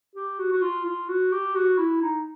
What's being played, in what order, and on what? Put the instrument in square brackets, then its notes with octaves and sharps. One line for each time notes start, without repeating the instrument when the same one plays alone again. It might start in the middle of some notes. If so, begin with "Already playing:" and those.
[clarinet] G4
F#4
F#4
F4
F4
F#4
G4
F#4
E4
D#4